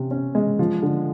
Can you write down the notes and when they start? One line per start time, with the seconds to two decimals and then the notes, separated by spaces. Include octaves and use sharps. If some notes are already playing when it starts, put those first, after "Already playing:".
Already playing: C3 C#4
0.11 C#4
0.35 G#3
0.59 F3
0.82 D3